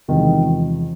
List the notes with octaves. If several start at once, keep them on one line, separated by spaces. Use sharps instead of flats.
E2 C3 D#3 F3 G#3